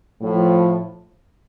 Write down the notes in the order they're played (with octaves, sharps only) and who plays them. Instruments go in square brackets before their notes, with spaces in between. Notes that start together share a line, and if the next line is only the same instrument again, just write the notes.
[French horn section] A2 F3